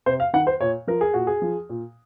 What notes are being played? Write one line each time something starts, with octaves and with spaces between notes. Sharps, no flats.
C3 C5
F5
D#3 F#5
C5
A#2 C#5
F3 A#4
G#4
A#2 F#4
G#4
F3
A#2